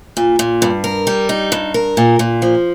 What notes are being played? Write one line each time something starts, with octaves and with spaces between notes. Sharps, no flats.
A#2
A#2
G2
A#4
G3
D#4
G2
A#4
A#2
A#2
F3